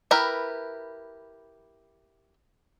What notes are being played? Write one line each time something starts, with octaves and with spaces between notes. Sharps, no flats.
E4 G4 A#4 B4